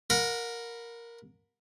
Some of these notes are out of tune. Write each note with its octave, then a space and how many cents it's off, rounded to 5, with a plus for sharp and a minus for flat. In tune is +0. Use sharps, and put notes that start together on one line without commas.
A#4 +0 F#5 -40 B5 +0